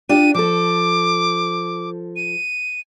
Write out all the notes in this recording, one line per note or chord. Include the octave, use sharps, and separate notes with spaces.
D4 F4 G4 D#7
F3 A4 D6
D#7